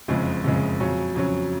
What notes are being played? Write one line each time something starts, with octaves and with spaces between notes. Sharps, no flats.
F#1 F2 C#3 G#3
F#1 F2 C#3 G#3
F2 C#3 F#3 C#4
F2 C#3 F#3 C#4